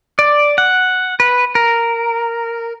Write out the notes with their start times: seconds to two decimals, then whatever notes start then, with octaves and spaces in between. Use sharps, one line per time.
0.19 D5
0.58 F#5
1.20 B4
1.55 A#4